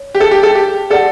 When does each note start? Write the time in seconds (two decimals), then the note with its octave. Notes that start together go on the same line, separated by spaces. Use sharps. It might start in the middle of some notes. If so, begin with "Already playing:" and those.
Already playing: C#5
0.15 G4
0.20 A4
0.31 G4
0.43 A4
0.55 G4
0.90 G4 A4 D5 F#5 A5